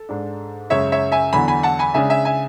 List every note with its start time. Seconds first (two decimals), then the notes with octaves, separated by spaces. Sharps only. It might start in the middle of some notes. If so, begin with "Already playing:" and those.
Already playing: A4
0.09 G#2 G#3 D4
0.70 F#2 C#3 G#3 C#4 C#5 E5
0.92 C#5 E5
1.12 E5 G#5
1.33 E2 D3 F#3 G#5 B5
1.48 G#5 B5
1.63 F#5 A5
1.79 G#5 B5
1.94 C#3 G#3 D4 E5 G#5
2.10 E5 G#5
2.25 E5 G#5